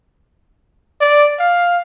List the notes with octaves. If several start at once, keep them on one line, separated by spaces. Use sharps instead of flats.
D5
F5